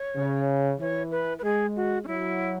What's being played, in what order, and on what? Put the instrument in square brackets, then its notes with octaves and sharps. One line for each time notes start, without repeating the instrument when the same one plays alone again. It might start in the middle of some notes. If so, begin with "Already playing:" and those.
Already playing: [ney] C#5
[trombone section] C#3
[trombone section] E3 [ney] C#5
[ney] B4
B4
[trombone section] G#3 [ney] G#4
[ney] F#4
C#4
[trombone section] F#3 [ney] E4